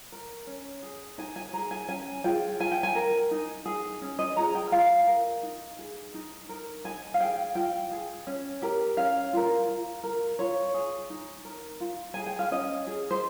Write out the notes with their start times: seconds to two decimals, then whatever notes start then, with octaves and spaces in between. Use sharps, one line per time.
0.12 A#4
0.47 C#4
0.83 G#4
1.18 D#4 G#5
1.36 G#5
1.53 G#4 A#5
1.71 G#5
1.89 C#4 G#5
2.24 F4 G#4 G5
2.60 F4 G#5
2.72 G5
2.83 G#5
2.95 A#4
3.31 D#4
3.66 G#4
4.02 C#4
4.19 D#5
4.37 F4 G#4 A#5
4.55 G5
4.72 F4 F5
5.07 A#4
5.43 D#4
5.79 G#4
6.14 D#4
6.49 A#4
6.84 D#4 G#5
7.14 F5
7.20 G#4 G5
7.55 F4 G5
7.91 G#4
8.27 C#4
8.62 G4 A#4
8.97 C#4 F5
9.33 F4 A#4
9.69 F4
10.04 A#4
10.39 F4 C#5
10.74 G#4
11.10 D#4
11.45 A#4
11.80 F4
12.14 G#4 G#5
12.26 G5
12.39 F5
12.51 C#4 D#5
12.87 G#4
13.11 C5